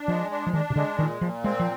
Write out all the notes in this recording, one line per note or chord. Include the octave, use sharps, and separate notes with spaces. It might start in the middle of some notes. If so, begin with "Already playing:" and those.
Already playing: D4
F3 G#3
D4
F3
D#3 D4
C3
D3 G#3
A#2 D#3
A#2 F3
G#3 C4
F3